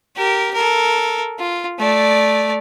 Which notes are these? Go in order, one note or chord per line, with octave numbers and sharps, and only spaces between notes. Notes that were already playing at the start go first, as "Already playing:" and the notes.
G4 A#4
A4 A#4
F4
A3 D5